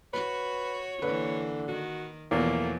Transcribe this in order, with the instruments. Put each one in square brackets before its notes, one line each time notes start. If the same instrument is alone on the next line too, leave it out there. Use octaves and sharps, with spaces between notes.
[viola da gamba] F#4 [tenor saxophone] B4 [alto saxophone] C#5
[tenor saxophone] D3 [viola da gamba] E3 A#3 [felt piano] B4
[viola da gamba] D#3 [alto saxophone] F#4
[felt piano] E2 [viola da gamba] B2 F3 F#3 [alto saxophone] A3 [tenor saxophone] A#3